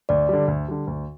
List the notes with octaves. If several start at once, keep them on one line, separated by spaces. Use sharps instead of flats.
D2 D5
D3 G3
D2
D3 G3
D2